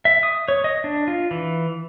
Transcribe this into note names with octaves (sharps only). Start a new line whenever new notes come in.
E5
D#6
C#5
D#5
D4
F4
E3